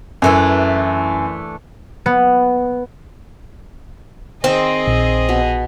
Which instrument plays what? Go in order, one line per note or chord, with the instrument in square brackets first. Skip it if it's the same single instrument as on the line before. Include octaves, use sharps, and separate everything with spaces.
[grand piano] F#2 [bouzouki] E3 A3 D4
[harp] B3
[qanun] D#3 [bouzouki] C4 [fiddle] G#4 D#5
[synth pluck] A#1
[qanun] B2